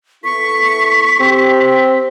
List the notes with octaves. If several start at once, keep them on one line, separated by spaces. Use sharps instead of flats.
B3 E4 A4 C#6 B6
C4 G4